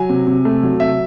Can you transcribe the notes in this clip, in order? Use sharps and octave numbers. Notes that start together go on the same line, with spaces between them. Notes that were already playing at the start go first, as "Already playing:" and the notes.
Already playing: F#3 G#5
C3
C3
A3
F#3
C3 E5